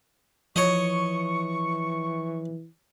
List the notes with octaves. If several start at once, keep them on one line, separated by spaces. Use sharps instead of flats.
E3 F3 C#5 D#5 C#6